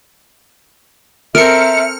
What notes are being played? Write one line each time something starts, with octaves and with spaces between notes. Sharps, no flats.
C4 A4 A#4 E5 F6 C#7